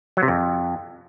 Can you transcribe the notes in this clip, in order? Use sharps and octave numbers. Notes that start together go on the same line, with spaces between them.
F#3
C3
F2